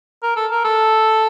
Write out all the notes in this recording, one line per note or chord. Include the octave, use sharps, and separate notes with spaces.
A#4
A4
A#4
A4